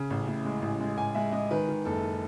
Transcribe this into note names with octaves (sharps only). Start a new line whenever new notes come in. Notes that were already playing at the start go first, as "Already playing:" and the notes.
Already playing: C#3
A1
A2
G#3
A1
G#3
A1 G#5
G#3 E5
G#3 D#5
D#3 B4
D#3
F#1 A4